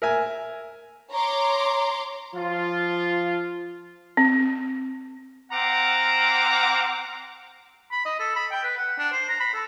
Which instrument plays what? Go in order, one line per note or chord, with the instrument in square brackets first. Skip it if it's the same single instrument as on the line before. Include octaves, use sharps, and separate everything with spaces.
[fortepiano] A#4 E5 G#5
[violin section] C#5 A#5 C6 D6
[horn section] F3 F4
[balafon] C4
[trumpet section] C4 F5 F#5 A#5 D6
[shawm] B5
D#5
A4
B5
G5
B4
F#5
D4
C5
A#5
B5
A4